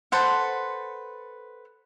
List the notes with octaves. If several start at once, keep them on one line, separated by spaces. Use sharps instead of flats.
A4 B4 C5 F#5